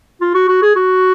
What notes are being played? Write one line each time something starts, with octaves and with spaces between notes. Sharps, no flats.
F4
F#4
F#4
G#4
F#4